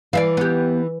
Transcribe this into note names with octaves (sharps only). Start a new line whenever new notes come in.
E3 D5 E5 F5
B3 G4